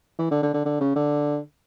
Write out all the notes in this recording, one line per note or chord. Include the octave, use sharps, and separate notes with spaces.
E3
D3
D3
D3
D3
C#3
D3